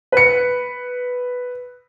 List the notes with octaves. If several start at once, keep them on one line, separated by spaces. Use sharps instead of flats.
B4 C#7